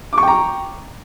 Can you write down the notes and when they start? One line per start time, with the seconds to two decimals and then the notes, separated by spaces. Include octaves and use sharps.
0.13 D6
0.18 C#6
0.23 G5
0.28 A#5